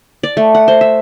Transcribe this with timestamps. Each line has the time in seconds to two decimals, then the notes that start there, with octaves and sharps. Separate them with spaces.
0.23 D5
0.37 A3
0.55 F#5
0.68 C5
0.81 E5